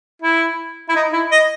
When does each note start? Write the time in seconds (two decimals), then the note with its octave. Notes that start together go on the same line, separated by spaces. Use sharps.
0.22 E4
0.89 E4
0.95 D#4
1.13 E4
1.31 D#5